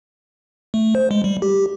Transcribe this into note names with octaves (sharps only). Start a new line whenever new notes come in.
A3
C5
G#3
G3
G4